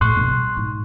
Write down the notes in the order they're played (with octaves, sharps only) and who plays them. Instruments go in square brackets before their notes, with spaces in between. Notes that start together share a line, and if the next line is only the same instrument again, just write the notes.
[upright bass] A2 [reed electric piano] C6 C#6 F#6
[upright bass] B2 D3
G3
G#2